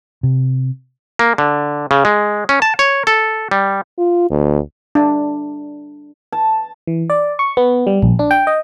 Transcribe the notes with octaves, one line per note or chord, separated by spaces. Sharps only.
C3
A#3
D3
C#3
G#3
C#4
A5
C#5
A4
G3
F4
D2
D4
A5
E3
D5
C#6
B3
G3
A#1
D4
G5
D#5